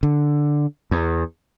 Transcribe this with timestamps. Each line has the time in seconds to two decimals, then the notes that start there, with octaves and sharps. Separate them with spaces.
0.03 D3
0.91 E2